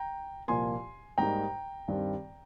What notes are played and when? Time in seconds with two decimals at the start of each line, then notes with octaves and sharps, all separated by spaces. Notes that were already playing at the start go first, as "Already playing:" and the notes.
Already playing: G5 A#5
0.48 C2 A#2 F3 A#3 G#5 C6
1.18 G#2 G3 A#3 D#4 G5 A#5
1.88 G2 D#3 G3 C4